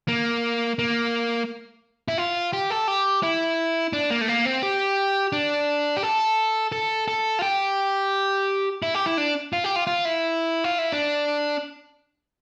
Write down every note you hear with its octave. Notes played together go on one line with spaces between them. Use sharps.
A#3
A#3
E4
F4
G4
A4
G4
E4
D4
A#3
A3
A#3
C4
G4
D4
G4
A4
A4
A4
F4
G4
E4
G4
E4
D4
F4
G4
F4
F4
E4
F4
E4
D4